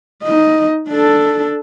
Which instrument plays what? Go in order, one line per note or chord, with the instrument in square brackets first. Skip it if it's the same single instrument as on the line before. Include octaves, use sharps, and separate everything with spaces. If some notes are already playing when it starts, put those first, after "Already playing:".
[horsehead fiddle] D#4 D#5
D4 A4